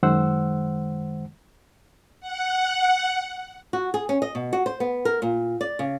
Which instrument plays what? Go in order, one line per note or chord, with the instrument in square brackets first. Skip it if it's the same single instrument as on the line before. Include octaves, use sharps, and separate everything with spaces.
[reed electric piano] F#2 D#3 G#3 C5 F#5 E6
[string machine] F#5
[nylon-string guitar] F#4
G#4
C#4
D#5
B2
F#4
C5
B3
A#4
A#2
D5
C#3